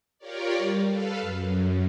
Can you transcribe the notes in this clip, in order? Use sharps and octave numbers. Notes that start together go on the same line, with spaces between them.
F4 G4 A#4 C#5 D5
G3
A4 B4 F5
F#2